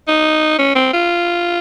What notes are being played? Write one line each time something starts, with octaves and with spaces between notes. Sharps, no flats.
D#4
C#4
C4
F4